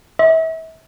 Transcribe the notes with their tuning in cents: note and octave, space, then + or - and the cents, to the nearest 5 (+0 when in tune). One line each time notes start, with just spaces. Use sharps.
E5 -35